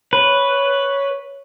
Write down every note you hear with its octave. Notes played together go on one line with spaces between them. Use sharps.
B4 C#5